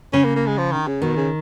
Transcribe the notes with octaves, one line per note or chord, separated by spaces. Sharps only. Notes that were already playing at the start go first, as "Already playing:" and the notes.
C#3 C#4
A#3
A#3
G#3
F3
D#3
C#3
B2 D#3
C#3